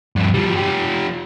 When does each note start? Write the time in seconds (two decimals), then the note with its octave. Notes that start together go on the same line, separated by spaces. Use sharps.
0.16 G2 F3
0.34 F3 G3
0.56 F3 G4